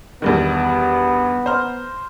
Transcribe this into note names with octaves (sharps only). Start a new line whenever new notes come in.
E2 G2 D#3 B3
C5 A#5 F6